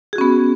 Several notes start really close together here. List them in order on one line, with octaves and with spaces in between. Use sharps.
G#4 F#4 C#4 B3